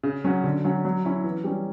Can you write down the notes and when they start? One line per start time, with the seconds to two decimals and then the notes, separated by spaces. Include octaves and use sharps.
0.03 C#3
0.24 F#3 C#4 F#4
0.44 D3
0.64 F#3 C#4 F#4
0.85 F#3
1.05 C#4 E4
1.24 E3
1.44 G3 C#4